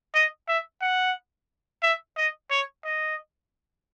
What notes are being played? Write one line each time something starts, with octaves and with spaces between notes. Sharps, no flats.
D#5
E5
F#5
E5
D#5
C#5
D#5